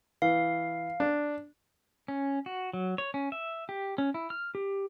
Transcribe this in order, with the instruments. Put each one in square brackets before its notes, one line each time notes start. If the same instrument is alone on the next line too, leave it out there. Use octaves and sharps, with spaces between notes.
[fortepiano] E3 [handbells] F5
[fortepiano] D4
[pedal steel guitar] C#4
F#4
F#3
C#5
C#4
E5
G4
C#4
E4
F6
G4